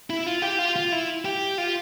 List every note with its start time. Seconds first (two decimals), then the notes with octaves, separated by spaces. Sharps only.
0.10 E4
0.27 F4
0.42 G4
0.59 F4
0.76 F4
0.92 E4
1.25 G4
1.58 F4